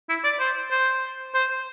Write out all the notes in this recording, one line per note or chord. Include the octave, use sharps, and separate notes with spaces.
E4
D5
C5
C5
C5